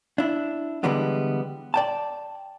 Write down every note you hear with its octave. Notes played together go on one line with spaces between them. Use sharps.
D4 E4
D3 E3 G3 G#3 B3 D4
D5 G5 A5